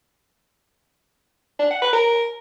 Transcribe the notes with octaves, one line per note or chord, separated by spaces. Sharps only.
D4
F#5
B4
A#4